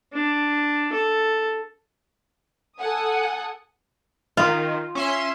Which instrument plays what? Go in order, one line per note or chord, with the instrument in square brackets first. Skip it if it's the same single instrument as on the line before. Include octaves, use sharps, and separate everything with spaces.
[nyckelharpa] D4
A4
[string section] A4 F#5 G#5 D#6
[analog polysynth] D#3 [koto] F4
[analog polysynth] C#4 E5 C6